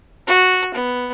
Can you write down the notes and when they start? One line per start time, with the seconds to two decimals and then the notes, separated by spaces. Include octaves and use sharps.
0.27 F#4
0.74 B3